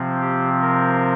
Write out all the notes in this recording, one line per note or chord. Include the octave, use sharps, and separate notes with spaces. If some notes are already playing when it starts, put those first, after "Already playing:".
Already playing: C3 F3 C4
G4
A#4